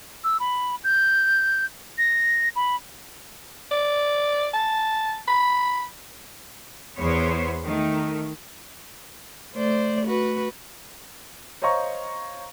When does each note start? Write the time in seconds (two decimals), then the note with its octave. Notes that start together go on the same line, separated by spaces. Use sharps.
0.24 E6
0.40 B5
0.84 G6
1.98 A#6
2.56 B5
3.72 D5
4.54 A5
5.28 B5
6.98 E2 B3 C5 C#5
7.64 D#3 A3
9.54 A3 C5 D5
10.07 F#4 B4
11.62 C5 C#5 D#5 F5 A#5 C#6